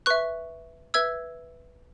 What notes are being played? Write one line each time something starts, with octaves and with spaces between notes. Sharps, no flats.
B4 E5 C#6 F#6
B4 E5 E6 G#6